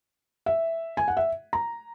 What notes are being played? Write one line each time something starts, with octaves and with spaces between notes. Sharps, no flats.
E5
G#5
F#5
E5
A#5